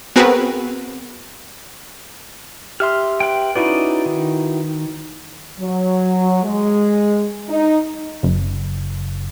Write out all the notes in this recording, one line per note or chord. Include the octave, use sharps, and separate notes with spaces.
B3 C4 F#4 G#4 A#4 B4
G4 E5 C6 F6
B4 G5
C#4 D#4 E4 F#4 B4 D5
D#3
F#3
G#3
D#4
F#1